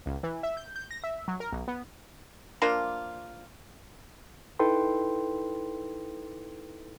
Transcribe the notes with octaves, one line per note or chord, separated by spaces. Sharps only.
C#2
E3
E5
G6
G6
A#6
E5
F#3
A#4
B1
B3
F3 A#3 D4 F4
D#4 E4 A4 B4 G5 C6